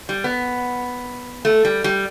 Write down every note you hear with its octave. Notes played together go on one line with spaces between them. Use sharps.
G3
B3
A3
G3
G3